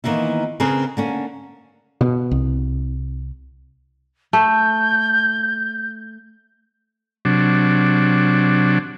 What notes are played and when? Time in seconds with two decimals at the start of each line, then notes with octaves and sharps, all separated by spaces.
0.04 D#3 E3 A#3 B3 E4
0.60 C#3 C4 C#4 G#4 A#4 B4
0.97 D3 A#3 C#4
2.01 B2
2.31 C2
4.33 A3 G6
7.25 C3 F#3 D4